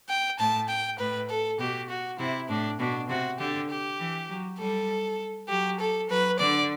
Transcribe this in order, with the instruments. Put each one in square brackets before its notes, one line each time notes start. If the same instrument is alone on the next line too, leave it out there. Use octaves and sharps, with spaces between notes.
[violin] G5
[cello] A2 [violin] A5
[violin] G5
[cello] A2 [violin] B4
[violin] A4
[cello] B2 [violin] G4
[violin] F#4
[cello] C3 [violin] E4
[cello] A2 [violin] D4
[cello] B2 [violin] D4
[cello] C3 [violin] F#4
[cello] D3 [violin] G4
[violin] G4
[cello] E3
F#3
[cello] G3 [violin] A4
[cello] F#3 [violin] G4
[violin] A4
[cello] F#3 [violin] B4
[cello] D3 [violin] D5